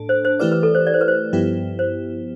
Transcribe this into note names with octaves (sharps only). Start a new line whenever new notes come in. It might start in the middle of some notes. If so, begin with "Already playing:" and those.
Already playing: A2 D4 A4
C5
C5
E3 A3 E4 G4 B4 D5
B4
A4
C5
D5
C5
B4
C5
G2 F3 B3 E4 G4
C5